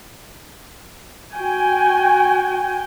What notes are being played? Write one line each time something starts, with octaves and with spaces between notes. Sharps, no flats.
F#4 G5 G#5